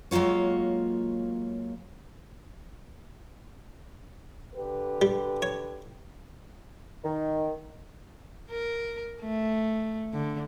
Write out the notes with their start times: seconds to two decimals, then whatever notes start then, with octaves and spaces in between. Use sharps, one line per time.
0.11 F#3 G#3 A#3 F4 C#5
4.55 D3 G4 B4
5.02 G3
5.42 C#5
7.04 D#3
8.51 A#4
9.21 A3
10.13 D3